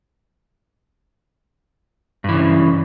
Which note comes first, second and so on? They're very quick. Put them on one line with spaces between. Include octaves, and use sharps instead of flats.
G2 E3 C#3